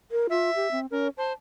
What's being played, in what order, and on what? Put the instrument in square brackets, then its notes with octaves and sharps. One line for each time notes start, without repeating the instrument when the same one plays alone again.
[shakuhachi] A#4
[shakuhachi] F4 [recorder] E5
[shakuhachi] G4
C4
[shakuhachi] C#4 [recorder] A#4
[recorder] C5 [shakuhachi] A5